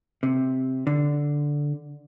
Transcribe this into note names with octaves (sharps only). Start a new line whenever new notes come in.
C3
D3